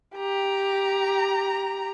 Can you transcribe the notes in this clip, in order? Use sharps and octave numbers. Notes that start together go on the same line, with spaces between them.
G4 A#5